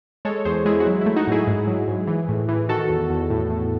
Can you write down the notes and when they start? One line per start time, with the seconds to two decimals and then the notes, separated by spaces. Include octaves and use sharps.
0.25 G#3 A4 C#5
0.45 E2 G#4 C5
0.65 G#3 E4 G#4
0.80 F#4
0.86 F#3 E4
1.01 A3 E4
1.16 D#4 F#4
1.27 A2 E4 G#4
1.47 G#2
1.67 F#3
1.88 G#2
2.07 E3
2.29 A2
2.49 E3
2.69 D#3 F#4 A4
2.89 E2
3.10 E2
3.30 A2
3.50 A2